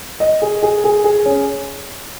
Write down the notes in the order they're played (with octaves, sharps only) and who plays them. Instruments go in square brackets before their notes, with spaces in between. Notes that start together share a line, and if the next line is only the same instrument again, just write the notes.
[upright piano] D#5
G#4
G#4
G#4
G#4
C#4